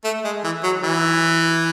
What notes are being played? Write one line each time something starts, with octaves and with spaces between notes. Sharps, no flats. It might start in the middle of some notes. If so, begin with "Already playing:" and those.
A3
G#3
E3
F#3
E3